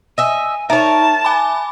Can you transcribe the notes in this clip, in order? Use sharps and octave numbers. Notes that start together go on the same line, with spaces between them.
D#5 E5 G#5
D#4 A#4 C#5 E5 A5
G#5 B5 D6